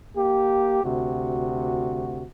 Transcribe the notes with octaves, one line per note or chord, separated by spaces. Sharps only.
A#3 G4
D2 C3 F#4